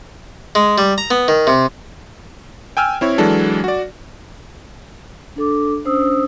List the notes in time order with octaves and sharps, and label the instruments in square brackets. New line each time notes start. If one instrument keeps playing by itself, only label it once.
[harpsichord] G#3
G3
A#5
B3
D#3
C3
[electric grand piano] G5 G#5 E6 F6
C4 E4 C#5
E3 F#3 G#3 D4 A4
F#4 D5
[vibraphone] D4 A4 D6
C#4 D4 C5 D#6 E6